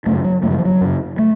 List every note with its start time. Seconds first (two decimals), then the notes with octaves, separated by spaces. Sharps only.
0.06 F#2 C#3 A3
0.24 F#3
0.43 F#2 C#3 A3
0.51 F#3
0.58 F3
0.65 F#3
0.81 F#2 C#3
1.19 A3